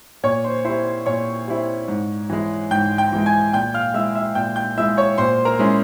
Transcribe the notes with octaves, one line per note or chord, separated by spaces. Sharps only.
A#2 C#5 C#6
C5 C6
G3 C4 E4 C5 C6
A#2 C#5 C#6
G3 C4 E4
G#2
E3 G#3
G#2 G5 G6
G5 G6
E3 G#3
G#5 G#6
A#2 G5 G6
F5 F6
G#3 E4 E5 E6
E5 E6
A#2 G5 G6
G5 G6
G#3 E4 E5 E6
C#5 C#6
A#2 C5 C6
A#4 A#5
G#3 C#4 E4